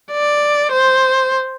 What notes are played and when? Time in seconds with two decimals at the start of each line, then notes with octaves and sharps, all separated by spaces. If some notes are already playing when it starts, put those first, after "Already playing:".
0.11 D5
0.71 C5